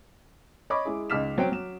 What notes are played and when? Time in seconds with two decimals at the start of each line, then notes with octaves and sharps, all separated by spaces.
0.70 C#5 D#5 B5 C#6 D6
0.85 G#3 E4 G#4
1.10 C#2 D#4 D6 F6 B6 E7
1.38 F#3 C4 G5 D7
1.52 F#3 E7